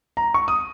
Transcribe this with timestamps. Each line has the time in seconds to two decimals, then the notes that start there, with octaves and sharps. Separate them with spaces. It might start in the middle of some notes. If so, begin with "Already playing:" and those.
0.17 A#5
0.34 C#6
0.48 D#6